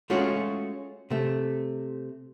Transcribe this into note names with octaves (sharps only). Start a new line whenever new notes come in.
G#3 A3 C#4 F4 F#4
C3 A3